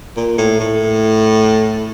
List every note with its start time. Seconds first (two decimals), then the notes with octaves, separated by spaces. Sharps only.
0.16 A#2
0.38 A2
0.59 A2